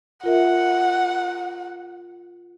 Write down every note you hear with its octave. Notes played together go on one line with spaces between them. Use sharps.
F4 A#4 E5 F#5